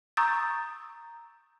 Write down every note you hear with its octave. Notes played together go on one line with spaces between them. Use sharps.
A#5 C#6 D#6 E6 G6 A6